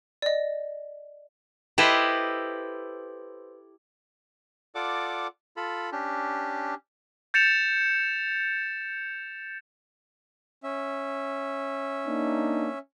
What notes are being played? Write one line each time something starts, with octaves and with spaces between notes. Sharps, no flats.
D5 D#5
E4 G4 A4 B4 C5 D#5
F4 A4 D5 F#5 D6
F4 A4 B5
C#4 D4 G4
G6 A6 C#7 E7 F7
C#4 E5
A#3 D4 D#4